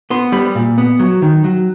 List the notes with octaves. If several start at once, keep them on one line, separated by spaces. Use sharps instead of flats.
B3 C6
G3 B5
A#2
B3
F#3
D#3
F#3